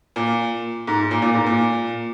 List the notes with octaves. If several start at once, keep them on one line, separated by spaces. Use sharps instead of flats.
A#2
G#2
A#2
A#2
G#2
A#2